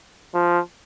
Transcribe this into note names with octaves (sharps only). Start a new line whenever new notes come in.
F3